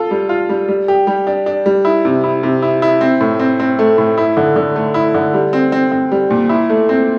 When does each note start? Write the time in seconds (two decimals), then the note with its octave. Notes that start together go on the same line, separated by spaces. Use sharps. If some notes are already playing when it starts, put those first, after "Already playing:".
Already playing: F4 A4
0.11 G3
0.29 F4
0.49 G3
0.68 G3
0.88 G4
1.07 G3
1.27 D4
1.46 D4
1.66 G3
1.85 E4
2.05 C3
2.24 E4
2.43 C3
2.62 E4
2.82 E4
3.01 C4
3.21 A2
3.39 C4
3.60 C4
3.79 A3
3.98 A2
4.18 E4
4.37 D3
4.56 D3
4.76 A3
4.94 E4
5.14 D3
5.34 G3
5.53 C4
5.72 C4
5.92 C4
6.12 G3
6.31 A#2
6.49 E4
6.70 A3
6.89 C4